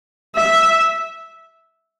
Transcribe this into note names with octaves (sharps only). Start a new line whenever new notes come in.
E5